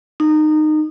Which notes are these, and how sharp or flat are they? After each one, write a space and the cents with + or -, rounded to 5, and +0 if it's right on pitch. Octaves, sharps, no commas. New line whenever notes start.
D#4 -20